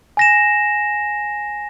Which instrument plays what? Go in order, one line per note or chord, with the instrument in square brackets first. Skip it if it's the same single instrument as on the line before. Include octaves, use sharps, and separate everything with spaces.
[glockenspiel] G#5 A#6 E7